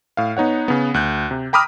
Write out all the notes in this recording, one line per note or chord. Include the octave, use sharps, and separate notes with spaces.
A2 F5
B3 D#4 C#5 F#5
C#3 B3
D2 F#6 G6
C3
G5 A#5 B5 D6 D#6 F6